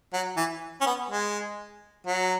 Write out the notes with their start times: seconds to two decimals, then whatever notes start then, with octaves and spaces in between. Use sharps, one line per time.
0.13 F#3
0.37 E3
0.81 C#4
0.86 B3
1.10 G#3
2.06 F#3